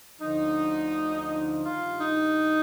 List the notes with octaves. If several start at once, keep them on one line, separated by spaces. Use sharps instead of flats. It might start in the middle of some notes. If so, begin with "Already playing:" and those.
D2 D3 F3 D#4
G2 D#3 F4
D#4